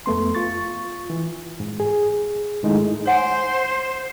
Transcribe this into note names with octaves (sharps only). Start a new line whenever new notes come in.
F2 A3 B3 C6
F4 C#6 A6
E3
G#2
G#4
G#2 D#3 G#3 A3 D#4 E4
C5 C#5 F#5 G#5